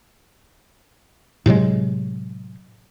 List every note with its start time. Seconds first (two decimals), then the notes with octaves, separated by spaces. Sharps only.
1.46 A2 C3 F#3 G#3